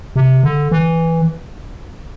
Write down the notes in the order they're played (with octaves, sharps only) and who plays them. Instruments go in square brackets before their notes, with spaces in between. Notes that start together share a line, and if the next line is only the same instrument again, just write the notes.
[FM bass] C3
D3
E3